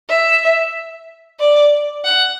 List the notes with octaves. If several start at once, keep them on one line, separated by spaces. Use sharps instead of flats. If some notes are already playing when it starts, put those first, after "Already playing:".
E5
D5
F#5